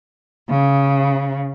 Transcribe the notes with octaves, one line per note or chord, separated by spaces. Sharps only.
C#3